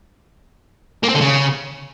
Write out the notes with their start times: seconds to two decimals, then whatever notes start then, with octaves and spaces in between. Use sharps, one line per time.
1.03 A#3
1.09 C4
1.15 D3
1.21 C#3